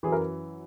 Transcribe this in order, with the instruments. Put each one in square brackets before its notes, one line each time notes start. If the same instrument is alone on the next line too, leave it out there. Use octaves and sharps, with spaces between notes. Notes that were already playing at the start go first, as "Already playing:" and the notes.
[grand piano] F#2 E3 G#4
A#4